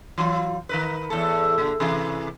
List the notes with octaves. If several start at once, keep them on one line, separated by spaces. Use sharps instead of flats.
E3 F#3 F4
D#3 A#4 B4
E2 A2 A4
A#2 D3
C3 E3 G#4